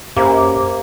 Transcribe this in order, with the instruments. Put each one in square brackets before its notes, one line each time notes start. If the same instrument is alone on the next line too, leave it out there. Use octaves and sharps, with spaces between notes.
[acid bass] F#2 [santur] A#3 [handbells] G4 [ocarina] C5